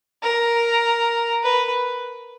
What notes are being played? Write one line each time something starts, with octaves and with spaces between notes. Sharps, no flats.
A#4
B4